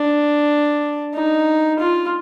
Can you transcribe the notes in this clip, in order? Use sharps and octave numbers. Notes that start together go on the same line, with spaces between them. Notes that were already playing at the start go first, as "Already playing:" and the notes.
Already playing: D4
D#4
F4